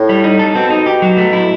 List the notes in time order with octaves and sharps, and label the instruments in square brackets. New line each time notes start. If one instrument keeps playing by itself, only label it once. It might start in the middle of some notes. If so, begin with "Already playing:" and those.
Already playing: [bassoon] A2
[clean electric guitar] G3
D#4
A4
[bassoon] B2 [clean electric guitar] C4
[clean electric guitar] D#4
G4
F#3
A3
E4